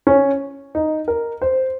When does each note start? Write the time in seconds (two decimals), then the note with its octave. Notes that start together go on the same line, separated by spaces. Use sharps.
0.07 C#4
0.75 D#4
1.08 A#4
1.42 C5